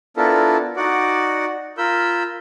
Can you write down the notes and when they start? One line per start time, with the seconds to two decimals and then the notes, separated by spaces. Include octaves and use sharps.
0.17 B3 D4 E4 F4 A4 A#4
0.76 D#4 F#4 D5 F#5
1.78 F4 A#4 B5 E6 G6